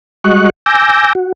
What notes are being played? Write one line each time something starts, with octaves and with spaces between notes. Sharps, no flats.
G3 G#3 F#4 D#5 C#6 F#6
G#5 D6 E6 G6 A#6
F#4